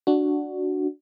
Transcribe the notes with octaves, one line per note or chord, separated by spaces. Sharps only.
D4 F#4